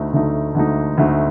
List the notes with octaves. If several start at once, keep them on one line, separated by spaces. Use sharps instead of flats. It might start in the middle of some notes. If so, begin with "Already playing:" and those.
Already playing: D2 D3 A3 D#4
D2 D3 A3 D#4
D2 D3 A3 D#4
D2 D3 A3 D#4